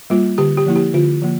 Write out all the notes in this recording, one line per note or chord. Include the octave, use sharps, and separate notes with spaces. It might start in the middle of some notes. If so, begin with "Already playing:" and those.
G3 A#3 F4
D3 G4
G4
F3 A#3 E4
G4
D3 F4
F3 A#3